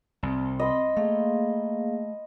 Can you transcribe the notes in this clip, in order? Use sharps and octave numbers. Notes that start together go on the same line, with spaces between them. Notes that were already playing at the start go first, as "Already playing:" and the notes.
C2 C4
D#5 B5 C6
A3 A#3 G#4 F5